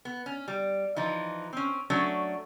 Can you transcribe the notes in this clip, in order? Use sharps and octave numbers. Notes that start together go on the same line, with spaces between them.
B3
C#4
G3
E3 F3 D#4
C4 C#4
F#3 A3 C#4 D4 A4